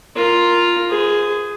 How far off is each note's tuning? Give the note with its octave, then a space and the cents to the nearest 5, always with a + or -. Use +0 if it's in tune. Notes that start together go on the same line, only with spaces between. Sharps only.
F4 +0 A#4 +0
G#4 +0 C5 -40